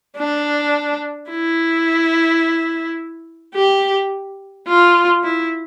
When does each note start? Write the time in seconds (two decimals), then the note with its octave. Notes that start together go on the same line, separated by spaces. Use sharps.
0.17 D4
1.30 E4
3.55 G4
4.68 F4
5.23 E4